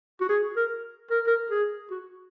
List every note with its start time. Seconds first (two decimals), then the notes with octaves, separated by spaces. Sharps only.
0.21 F#4
0.29 G#4
0.56 A#4
1.10 A#4
1.27 A#4
1.50 G#4
1.90 F#4